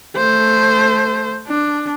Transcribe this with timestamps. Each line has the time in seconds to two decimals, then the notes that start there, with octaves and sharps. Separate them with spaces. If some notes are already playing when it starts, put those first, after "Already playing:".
0.17 A3 C5
1.48 D4